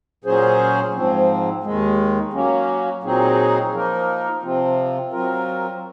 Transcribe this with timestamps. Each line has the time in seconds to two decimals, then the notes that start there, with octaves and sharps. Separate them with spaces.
0.24 A#2 F#3 C#4 G#4 C5
0.95 G#2 F3 C4
1.63 D#2 D#3 G#3
2.33 F#3 A#3 C#4
3.03 A#2 F#3 C4 D#4 G#4
3.72 F3 A#3 D#4 A#4
4.42 C3 F3 C4 F4
5.12 F#3 C4 F4 A#4